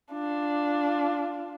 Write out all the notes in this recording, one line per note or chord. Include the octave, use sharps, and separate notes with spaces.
D4 F4